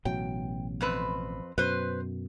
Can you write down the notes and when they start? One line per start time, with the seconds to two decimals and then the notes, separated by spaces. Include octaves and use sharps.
0.05 A1 B2 F#3 G5
0.81 F2 C4 B4
1.58 F#2 B2 B4 C5